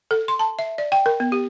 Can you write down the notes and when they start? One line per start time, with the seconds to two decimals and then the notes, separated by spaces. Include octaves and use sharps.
0.11 A4
0.28 C6
0.39 A5
0.59 E5
0.78 D5
0.92 G5
1.06 A#4
1.20 B3
1.32 G4